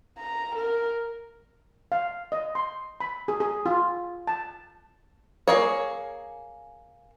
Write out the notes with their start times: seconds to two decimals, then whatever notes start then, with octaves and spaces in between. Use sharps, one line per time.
0.18 A#5
0.55 A#4
1.92 F5
2.32 D#5
2.55 C6
3.00 B5
3.28 G#4
3.40 G#4
3.66 F4
4.27 A5
5.48 A#3 G#4 C#5